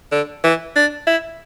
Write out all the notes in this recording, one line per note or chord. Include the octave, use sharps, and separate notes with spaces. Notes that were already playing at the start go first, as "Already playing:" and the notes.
D3
E3
D4
E4